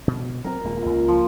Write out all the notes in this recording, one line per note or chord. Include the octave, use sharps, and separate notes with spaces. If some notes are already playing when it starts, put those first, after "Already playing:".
B2
F#3 C4 A#4
D#1 A#2 G#3
C#2 C#3
F3